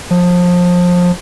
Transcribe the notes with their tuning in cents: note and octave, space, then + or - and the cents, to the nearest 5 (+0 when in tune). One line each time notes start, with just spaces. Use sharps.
F3 +25